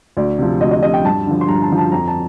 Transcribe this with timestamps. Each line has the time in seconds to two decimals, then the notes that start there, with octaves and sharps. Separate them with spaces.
0.17 D2 D5
0.39 C3 F3
0.61 D2 D#5
0.71 D#5
0.83 C3 F3 D#5
0.94 G5
1.04 G2 A5
1.27 D3 F3
1.41 C6
1.48 G2 A#5
1.63 A5
1.71 D3 F3
1.78 A5
1.92 F2 A#5
2.08 A5